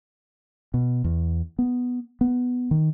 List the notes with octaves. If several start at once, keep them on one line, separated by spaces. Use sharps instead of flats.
B2
E2
B3
B3
D#3